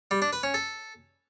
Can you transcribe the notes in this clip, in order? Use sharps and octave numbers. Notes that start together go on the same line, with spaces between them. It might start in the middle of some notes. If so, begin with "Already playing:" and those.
G3
D4
B4
C#4
A4